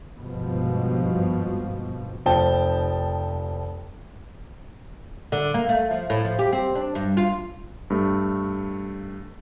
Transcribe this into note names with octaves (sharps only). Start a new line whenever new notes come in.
G#1 G2 B2 F3
F1 F3 G5 A5
D3
A#3
A3
F3
A2
F3
G4
C4
D4
G2
F4
G2 A3